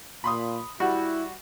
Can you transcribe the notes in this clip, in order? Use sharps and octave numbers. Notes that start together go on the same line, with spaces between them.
A#2 B5 C6 D#6
G3 E4 F#4 F#5